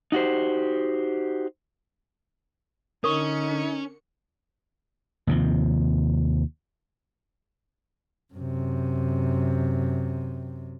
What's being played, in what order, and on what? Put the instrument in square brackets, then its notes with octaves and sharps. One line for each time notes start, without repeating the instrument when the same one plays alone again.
[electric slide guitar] D#4 F#4 G4 C5
[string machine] D3 C#7 [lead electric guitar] C#4 [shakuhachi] D#4 [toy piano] A#4 C#6
[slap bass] D#2 C3 F3
[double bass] F#2 C3